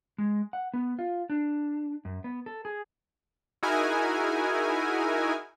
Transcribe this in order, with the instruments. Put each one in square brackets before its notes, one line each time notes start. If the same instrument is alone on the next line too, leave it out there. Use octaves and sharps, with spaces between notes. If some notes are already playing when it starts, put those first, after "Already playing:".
[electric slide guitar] G#3
F#5
B3
F4
D4
F#2
B3
A4
G#4
[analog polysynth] D#4 E4 F#4 G#4 A#4 G#5